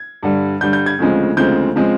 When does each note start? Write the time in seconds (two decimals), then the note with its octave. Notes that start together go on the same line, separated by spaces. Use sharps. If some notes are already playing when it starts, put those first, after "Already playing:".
Already playing: G#6
0.23 G2 D3 G3
0.61 G2 D3 G3 G6
0.73 G6
0.86 G#6
0.99 D2 C#3 F3 G#3 C4
1.37 D2 C#3 F3 G#3 C4 G6
1.75 C#3 F3 G#3 C4